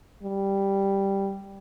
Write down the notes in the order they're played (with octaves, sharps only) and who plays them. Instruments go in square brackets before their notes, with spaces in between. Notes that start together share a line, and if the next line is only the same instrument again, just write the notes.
[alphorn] G3